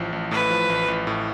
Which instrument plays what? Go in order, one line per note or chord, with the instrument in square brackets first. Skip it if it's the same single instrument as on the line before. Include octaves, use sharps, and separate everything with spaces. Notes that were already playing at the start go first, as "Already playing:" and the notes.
Already playing: [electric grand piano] A1 A2 F3
A1
[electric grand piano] A2 [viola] B4
[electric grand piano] F3
A1
A1
A2